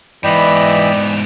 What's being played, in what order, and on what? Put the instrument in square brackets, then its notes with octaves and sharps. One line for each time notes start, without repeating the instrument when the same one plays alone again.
[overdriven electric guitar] G#2 B3 [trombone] E3 [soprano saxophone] D5 [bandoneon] D#5 G5 B5